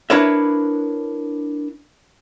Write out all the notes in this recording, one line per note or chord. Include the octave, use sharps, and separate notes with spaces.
D4 E4 A#4 B4 C#5 E5